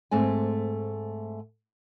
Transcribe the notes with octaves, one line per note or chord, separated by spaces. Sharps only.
G#2 A3 C4 G#5